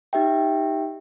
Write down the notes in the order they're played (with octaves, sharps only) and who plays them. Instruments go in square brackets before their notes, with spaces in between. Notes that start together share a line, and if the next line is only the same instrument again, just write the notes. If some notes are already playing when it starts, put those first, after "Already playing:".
[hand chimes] D#4 G4 E5 G5